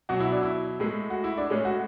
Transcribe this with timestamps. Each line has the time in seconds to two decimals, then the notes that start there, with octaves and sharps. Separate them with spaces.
0.09 B2 F#3 F#4
0.20 E4
0.32 D4
0.43 E4
0.80 A2 G#3
1.10 F#4
1.24 E4
1.37 D4
1.50 A2 G#3 C#4
1.65 F#4